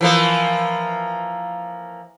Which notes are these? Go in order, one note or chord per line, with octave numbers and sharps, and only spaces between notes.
E3 F3 A#3